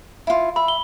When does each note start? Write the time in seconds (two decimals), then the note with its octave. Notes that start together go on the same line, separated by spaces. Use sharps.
0.27 E4 F4
0.56 E5 B5
0.68 G7